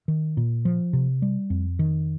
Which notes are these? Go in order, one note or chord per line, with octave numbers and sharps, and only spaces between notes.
D#3
A#2
F3
C3
G3
F2
D#3